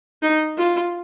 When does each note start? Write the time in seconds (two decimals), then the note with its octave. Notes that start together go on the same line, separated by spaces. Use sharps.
0.22 D#4
0.58 F4